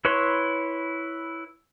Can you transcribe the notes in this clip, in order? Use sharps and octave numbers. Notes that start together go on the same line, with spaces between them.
E4 B4 C#5 C6 C#6